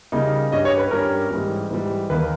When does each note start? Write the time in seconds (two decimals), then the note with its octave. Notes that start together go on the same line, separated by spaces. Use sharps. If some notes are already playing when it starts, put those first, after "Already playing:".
0.12 C#3 G3 A#3 D#4
0.52 G2 G3 C#4 D#5
0.65 C#5
0.77 B4
0.91 G2 G3 C#4 A#4
1.31 G#2 E3 G3
1.71 G#2 E3 G3
2.10 D#2 D#3 A#3 B4